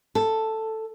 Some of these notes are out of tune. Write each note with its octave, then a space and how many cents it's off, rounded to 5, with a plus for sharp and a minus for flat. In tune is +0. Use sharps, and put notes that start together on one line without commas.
A4 +5